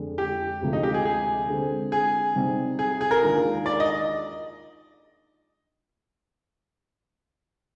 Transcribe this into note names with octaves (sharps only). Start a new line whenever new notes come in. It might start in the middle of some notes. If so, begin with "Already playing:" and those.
Already playing: F2 D3 G#3 D4
G4
D2 C3 F3 G#3
D#4
G4
G#4
G#4
D3 G#3 C4
G#4
C3 G3 C4 D#4
G#4
G#4
A#4
D#2 D#3 G#3 D4 F4
D5
D#5